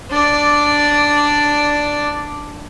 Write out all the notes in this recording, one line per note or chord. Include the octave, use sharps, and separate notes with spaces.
D4 D5